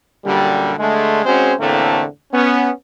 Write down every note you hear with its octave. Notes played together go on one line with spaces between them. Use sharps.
F#2 A#2 D3 G3
D3 G#3 A3
G#3 C4 C#4 F#4 G#4 C5
E2 A2 D3 A3 A#3 C4
B3 C#4